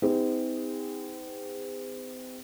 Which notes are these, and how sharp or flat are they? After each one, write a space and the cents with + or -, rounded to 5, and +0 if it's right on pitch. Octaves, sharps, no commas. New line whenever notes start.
C4 -40 D#4 +35 G#4 -45